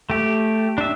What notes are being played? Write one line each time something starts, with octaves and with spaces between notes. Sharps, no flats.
A3 G4
D4 E5